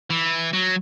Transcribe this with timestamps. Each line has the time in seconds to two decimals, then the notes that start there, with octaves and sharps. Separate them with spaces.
0.10 E3
0.54 F#3